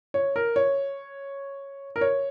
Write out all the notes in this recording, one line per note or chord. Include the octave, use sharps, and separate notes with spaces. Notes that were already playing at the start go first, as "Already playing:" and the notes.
C#5
A#4
C#5
A#4
C#5